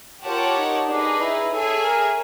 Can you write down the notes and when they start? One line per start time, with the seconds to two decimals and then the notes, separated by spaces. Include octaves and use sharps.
0.24 F4 G4 A#4 C#5 F#5 A5
0.57 D#4
0.88 D4 D#4 G#4 B4
1.20 E4
1.52 G#4 A4 C#5 E5 G#5
1.84 A#4